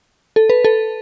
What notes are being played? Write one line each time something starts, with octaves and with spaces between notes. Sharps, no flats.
A4
B4
A4